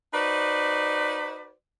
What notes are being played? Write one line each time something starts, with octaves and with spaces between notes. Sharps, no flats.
D#4 F#4 B4 C5 D5